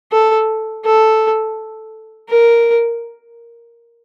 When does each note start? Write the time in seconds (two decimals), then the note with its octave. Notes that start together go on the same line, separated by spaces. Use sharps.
0.12 A4
0.85 A4
2.29 A#4